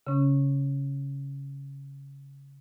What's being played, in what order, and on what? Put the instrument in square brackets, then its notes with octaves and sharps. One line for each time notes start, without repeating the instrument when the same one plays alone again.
[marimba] C#3 C#4